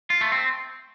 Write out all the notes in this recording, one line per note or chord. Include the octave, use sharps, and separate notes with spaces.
F4
A3
C4